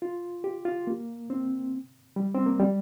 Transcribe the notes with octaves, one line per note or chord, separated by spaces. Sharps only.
F4
G4
F4
A#3
C4
G3
C4
A#3
G3